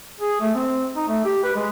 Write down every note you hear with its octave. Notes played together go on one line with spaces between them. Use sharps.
G#4
A3
C4
D#4
A3
G4
B4
G#3